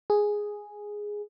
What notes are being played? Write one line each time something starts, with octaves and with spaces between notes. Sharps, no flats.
G#4